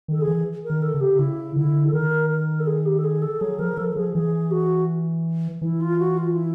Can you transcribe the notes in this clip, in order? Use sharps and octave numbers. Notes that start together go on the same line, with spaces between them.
D#3 A4
G#4
E3
A#4
D#3
A4
C#3
G4
C#3 E4
D3 E4
A4
D#3 A#4
A#4
A4
G#4
G4
A4
G#4
A4
F#3 G#4
F3 A#4
F3 A4
A4
F3 G#4
E3 G#4
F#4
E3 E4
F4
F#4
F4
E4